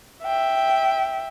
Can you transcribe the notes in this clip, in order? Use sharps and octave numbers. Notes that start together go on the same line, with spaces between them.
E5 G5